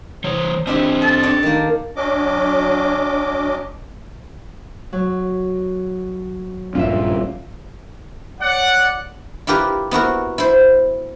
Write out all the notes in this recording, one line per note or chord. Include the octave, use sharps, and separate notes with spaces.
E3 C5 C#5
C4 D4 E4 G4 C5 D#5
A4 A5
D4 C#5 G5
D#3 A#3
F#3 C#4 D4 D#5 D6
F#3
A#1 G2 C#4 F4 E5
C#5 D5 F#5
E4 F4 G4 A#4 B4
B3 E4 F#4 A#4
E4 C5